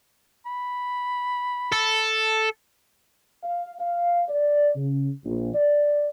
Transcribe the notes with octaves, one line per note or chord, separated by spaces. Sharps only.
B5
A4
F5
F5
D5
C#3
A#1
D5